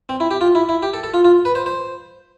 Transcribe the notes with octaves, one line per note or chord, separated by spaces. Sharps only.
C4
E4
G4
F4
E4
E4
G4
A4
A4
F4
F4
B4
C5
C5